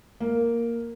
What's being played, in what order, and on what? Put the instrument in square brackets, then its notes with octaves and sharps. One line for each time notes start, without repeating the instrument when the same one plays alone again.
[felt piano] A#3